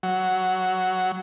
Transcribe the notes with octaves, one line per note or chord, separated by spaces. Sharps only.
F#3